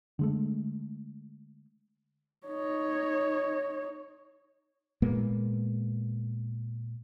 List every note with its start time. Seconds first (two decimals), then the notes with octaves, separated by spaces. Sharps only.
0.19 D3 G#3 A3
2.47 D#4 C#5
5.02 A#2 G#3 A#3 B3